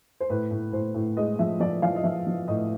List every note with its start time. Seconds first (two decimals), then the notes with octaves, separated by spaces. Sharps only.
0.20 C5
0.30 A2 B4
0.51 A2
0.73 A2 C5
0.94 A2
1.17 G#3 D#5
1.39 F3 E5
1.60 F3 D5
1.82 F3 F5
1.96 D#5
2.04 F3 E5
2.27 F3
2.48 A2 D#5